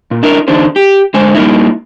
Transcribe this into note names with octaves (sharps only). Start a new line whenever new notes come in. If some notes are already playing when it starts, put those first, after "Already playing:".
A#2
D4 E4 A#4
E2 D3 D4 D#4 C5
G4
D3 G#3 C5 G#5
G3 A#3 D#4 E4